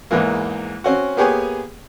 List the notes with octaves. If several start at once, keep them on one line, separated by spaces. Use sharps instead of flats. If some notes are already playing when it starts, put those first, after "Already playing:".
E2 G#2 E3 A#3
C4 C#4 F#4
A#3 B3 G4 G#4 C#5 G#5